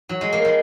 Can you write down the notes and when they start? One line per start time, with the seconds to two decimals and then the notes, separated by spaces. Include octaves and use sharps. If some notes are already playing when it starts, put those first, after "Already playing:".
0.09 F#3
0.21 G#3
0.33 A#3
0.45 G#3